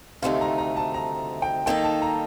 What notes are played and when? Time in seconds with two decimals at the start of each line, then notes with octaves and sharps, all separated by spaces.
0.22 D2 C3 D#3 A3 D#4 F5
0.41 A#5
0.58 A#5
0.76 A5
0.94 A#5
1.42 G5
1.66 D#3 A#3 D#4 A4 G5
1.84 A5
2.02 A#5